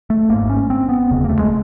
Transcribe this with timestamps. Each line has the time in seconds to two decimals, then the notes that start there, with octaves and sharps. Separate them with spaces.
0.10 A3
0.29 G#1 G#2 A#3
0.49 C#4
0.70 C4
0.89 B3
1.09 E1 D2 C#3
1.25 A#3
1.29 A3
1.39 G#3